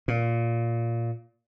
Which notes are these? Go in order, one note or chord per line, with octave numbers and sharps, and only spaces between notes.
A#2